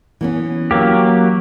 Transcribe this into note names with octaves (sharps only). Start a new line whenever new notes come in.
E3 B3 C#4
F#3 A#3 G4